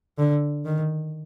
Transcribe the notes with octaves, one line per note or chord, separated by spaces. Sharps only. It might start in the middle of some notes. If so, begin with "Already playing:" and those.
D3
D#3